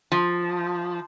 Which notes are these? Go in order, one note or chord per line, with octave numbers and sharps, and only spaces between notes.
F3